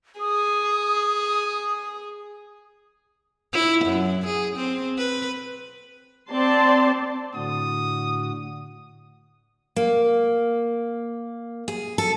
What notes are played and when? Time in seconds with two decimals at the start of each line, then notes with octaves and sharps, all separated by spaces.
0.20 G#4 D#6
3.53 E4
3.85 F#2
4.26 G#4
4.56 C4
4.97 B4
6.30 C4 D5 A5 C6
7.35 A2 D3 F#4 D#6
9.76 A#3
11.68 G#4
11.98 A4